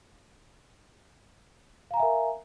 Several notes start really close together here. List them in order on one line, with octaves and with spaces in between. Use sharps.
F5 A#5 G#5 E5 A#4